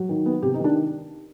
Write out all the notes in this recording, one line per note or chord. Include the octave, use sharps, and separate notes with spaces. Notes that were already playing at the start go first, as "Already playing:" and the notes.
Already playing: F#3
D#3
B3
C3 G4
D#4
D#3
D4